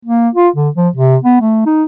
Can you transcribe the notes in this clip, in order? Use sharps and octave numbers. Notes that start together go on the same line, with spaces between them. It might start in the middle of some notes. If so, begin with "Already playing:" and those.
A#3
F4
D3
F3
C3
B3
A3
D#4